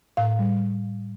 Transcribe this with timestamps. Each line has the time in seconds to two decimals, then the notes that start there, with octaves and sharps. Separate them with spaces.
0.17 A2 F5
0.39 G3